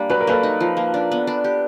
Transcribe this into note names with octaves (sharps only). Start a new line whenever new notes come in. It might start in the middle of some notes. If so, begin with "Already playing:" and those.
Already playing: G3 A#3 D4
F#3 B4
A#4
A#3 A4 B4
D#4
F3
A#3
D4
B3
D4
G4